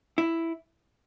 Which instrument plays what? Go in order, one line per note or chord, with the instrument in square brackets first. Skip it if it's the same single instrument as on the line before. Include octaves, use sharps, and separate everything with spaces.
[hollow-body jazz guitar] E4